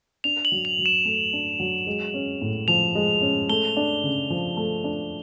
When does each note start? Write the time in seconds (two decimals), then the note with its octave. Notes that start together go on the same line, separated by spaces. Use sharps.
0.24 D4 F7
0.45 F#7
0.52 F#3
0.65 F7
0.79 F#3
0.86 E7
1.05 A3
1.33 D4
1.60 F#3
1.87 G#3
2.14 C#4
2.41 A2
2.68 F3 F7
2.95 G#3
3.21 C#4
3.49 A3 G7
3.77 D4
4.04 C#3
4.30 F3
4.57 A3
4.84 D4